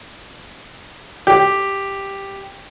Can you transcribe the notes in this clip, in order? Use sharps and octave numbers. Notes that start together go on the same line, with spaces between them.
G4